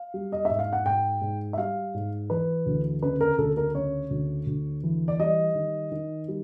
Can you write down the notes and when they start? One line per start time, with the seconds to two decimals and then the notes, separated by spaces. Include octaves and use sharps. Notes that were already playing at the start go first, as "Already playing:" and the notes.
Already playing: F5
0.14 G3
0.32 D#5
0.45 G#2 E5
0.59 F5
0.73 F#5
0.85 G#2 G5
1.21 G#2
1.53 E5
1.58 G3 F5
1.94 G#2
2.30 E3 B4
2.66 D2
3.02 C#3 B4
3.21 A#4
3.38 D2 A4
3.57 A#4
3.75 C#3 C#5
4.10 D2
4.46 D2
4.83 E3
5.08 D5
5.19 G3 D#5
5.55 D#3
5.92 D#3
6.28 G3